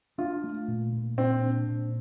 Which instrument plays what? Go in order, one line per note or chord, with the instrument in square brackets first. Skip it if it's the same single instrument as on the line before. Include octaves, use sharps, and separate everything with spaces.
[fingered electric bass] D4 [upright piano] F4
[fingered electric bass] A3
A#2
A#2
[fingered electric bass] A#2 [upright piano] C4
[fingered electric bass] D4
A#2